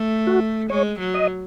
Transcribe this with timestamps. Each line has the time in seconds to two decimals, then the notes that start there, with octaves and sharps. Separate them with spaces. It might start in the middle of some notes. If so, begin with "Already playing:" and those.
Already playing: A3
0.27 F#4
0.70 G#3 C#5
0.99 F#3
1.14 D#5